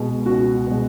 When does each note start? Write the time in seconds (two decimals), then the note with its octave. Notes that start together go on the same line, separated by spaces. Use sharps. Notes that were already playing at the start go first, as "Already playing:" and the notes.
Already playing: C#2 B2 G#3
0.26 C#2 F#4
0.67 B2 G#3